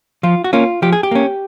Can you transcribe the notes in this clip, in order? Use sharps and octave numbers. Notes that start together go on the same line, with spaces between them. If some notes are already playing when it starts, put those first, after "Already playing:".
F3 F4
F#4
A#3 C#4 F4
F3 G4
G#4
G4
A#3 C#4